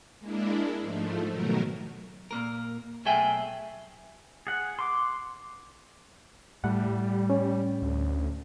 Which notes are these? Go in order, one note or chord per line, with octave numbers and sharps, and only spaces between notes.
G#3 A#3 D4 E4
G#2 F3 A3
B2 D#3 F#3 A3 A#4
A#2 A#3 A#4
B1 A3 G#4 E5 G5 G#5
G#4 F#5
C6 D6
A2 G3 F#5
C#4
D2